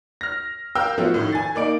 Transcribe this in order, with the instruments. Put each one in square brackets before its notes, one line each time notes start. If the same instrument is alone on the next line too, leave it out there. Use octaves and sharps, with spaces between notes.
[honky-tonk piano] F6 A#6
A#4 F5 G5 E6 G6
F3 A3 B3 C#4 F4 F#4
A2 D#3
G#5 A6
A#3 D#4 D5 D7